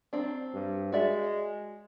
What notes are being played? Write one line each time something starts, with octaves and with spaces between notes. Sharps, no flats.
F#3 C4 D4
G2
G#3 F#4 D5 E5